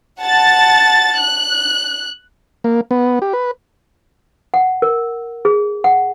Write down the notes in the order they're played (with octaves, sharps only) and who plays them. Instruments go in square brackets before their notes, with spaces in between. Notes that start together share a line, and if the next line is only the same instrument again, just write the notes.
[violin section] F#5 A5 A6
F#6
[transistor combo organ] A#3
B3
G4
B4
[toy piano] F#5
A#4
G#4
F#5